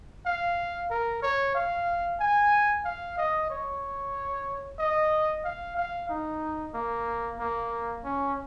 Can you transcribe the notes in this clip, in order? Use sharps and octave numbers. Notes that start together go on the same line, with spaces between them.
F5
A#4
C#5
F5
G#5
F5
D#5
C#5
D#5
F5
F5
D#4
A#3
A#3
C#4